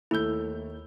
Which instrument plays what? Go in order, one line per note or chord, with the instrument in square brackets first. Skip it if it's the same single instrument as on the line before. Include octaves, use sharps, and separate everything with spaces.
[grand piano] D#2 E6 G7 [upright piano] A3 [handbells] E4 G6